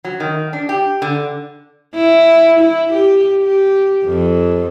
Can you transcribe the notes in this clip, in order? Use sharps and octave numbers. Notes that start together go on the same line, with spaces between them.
F#3
D#3
D4
G4
D3
E4
E4
G4
G4
F2